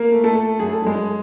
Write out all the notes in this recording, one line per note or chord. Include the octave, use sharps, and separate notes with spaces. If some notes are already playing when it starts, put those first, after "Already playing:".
Already playing: A#3 A#4
A3
A3 A4
A3
F#2 G#4
A4
F#2 G#3 G#4